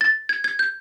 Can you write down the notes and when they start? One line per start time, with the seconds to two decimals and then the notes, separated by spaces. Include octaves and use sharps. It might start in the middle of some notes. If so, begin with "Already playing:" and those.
0.01 A6
0.29 G#6
0.44 G#6
0.59 G6